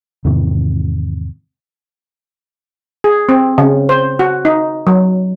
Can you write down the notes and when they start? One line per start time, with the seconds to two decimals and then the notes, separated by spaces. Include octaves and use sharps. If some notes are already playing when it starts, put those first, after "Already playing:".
0.25 E2 G#2 C3 D#3
3.04 G#4
3.29 C4
3.58 C#3
3.89 C5
4.19 F#4
4.45 D#4
4.87 F#3